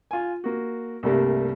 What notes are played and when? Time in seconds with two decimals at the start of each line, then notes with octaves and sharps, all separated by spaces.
0.11 F4 G#5
0.44 A#3 F#4
1.03 C2 G2 G3 A3 A#3